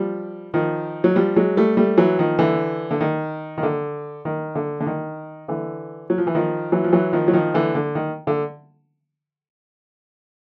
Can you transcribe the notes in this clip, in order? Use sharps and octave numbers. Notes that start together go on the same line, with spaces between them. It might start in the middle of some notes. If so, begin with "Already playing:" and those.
Already playing: F3 G3
D#3 F3
F#3
F3 G3
F#3 G#3
G3 A3
G3 A3
E3 F#3
D#3 F3
D3 E3
D3
D#3
D#3
D3
D#3
D3
D3
D#3
D3 E3
F#3
F3
E3
D#3 F3
E3 F#3
F3
E3 F#3
D#3 F3
F#3
D#3 F3
D3 E3
D3
D#3
D3